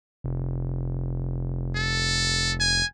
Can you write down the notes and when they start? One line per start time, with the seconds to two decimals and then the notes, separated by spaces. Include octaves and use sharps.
0.24 F1
1.76 A4
2.60 G#5